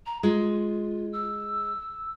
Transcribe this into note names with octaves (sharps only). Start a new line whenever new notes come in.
A#5
G#3 F4
E6